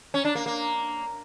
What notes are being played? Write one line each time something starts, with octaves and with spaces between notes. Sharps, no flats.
C#4
D4
A#3
A#3